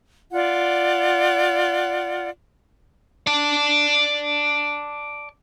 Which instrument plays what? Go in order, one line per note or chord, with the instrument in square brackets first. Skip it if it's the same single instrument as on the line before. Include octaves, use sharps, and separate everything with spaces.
[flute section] F4 D5 F#5
[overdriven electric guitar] D5 A5